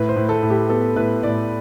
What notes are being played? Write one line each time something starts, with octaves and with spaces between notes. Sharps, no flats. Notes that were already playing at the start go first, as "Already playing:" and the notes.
Already playing: A2 B4
C5
A2
A4
A2
G4
B3 A4
A2 B4
A2 D5